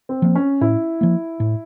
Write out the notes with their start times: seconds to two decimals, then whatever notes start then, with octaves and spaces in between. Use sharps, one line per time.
0.09 C4
0.22 F3 A#3
0.35 C#4
0.61 A2 E4
1.01 F3 A#3
1.40 A2